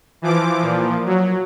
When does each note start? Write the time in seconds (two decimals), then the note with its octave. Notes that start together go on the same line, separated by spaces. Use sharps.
0.22 E3 F3 D6
0.61 A#2 F3
1.06 F#3